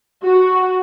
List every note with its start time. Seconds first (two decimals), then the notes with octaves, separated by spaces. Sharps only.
0.25 F#4